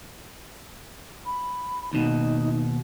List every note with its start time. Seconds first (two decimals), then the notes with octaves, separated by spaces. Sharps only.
1.26 B5
1.93 D#2 B2 D#4